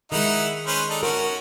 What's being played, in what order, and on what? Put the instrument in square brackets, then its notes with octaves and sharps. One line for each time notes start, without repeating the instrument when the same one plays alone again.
[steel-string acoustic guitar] D#3 G#3 [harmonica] D#4 E4 F#5
[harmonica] C#4 B4 C5
D4 D#4 A4
[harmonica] C#4 F#4 [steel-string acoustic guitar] A#4